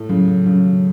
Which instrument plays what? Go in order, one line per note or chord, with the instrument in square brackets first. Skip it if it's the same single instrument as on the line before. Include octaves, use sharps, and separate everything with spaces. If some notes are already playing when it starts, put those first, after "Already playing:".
Already playing: [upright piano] A2
[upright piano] C#3 [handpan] F#3
[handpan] F#3
[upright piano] C#3 [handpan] F#3
[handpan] D#3